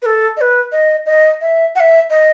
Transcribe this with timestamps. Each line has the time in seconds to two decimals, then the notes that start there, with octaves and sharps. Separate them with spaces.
0.02 B4
0.06 A4
0.37 D#5
0.41 B4
0.72 D#5
1.06 D#5
1.41 E5
1.75 F#5
1.80 E5
2.10 D#5